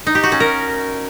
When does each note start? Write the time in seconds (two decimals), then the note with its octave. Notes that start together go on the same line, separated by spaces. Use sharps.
0.07 D#4
0.15 G4
0.23 F#4
0.32 C#4
0.40 A#4